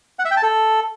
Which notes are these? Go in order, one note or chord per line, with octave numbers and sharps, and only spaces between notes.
F#5
E5
G5
A5
A4